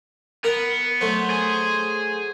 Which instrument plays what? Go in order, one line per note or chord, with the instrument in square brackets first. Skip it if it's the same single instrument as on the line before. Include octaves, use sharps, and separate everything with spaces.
[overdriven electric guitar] B3 [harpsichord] A#4 F#5
[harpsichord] F#3 A3 [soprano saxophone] C5
[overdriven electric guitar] G#4